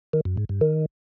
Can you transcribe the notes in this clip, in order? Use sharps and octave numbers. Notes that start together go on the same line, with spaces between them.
D#3
F#2
G#2
G2
D#3